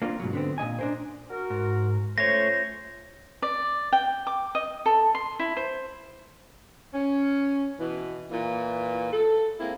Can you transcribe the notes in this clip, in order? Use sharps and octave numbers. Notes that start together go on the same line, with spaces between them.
A#3 C4 D4 F4
G#2 B2 F#3
D3 B3 C4
A#2 F#3 D#5 G#5
D4 A#4 C5
F#4 A#4
G#2
A3 C#4 F4 C5 C#5 A#6
D5
G5
D6
D#5
A4
C6
E4
C5
C#4
B2 E3
A#2 E3
A4
G#3 A#3 C4 E4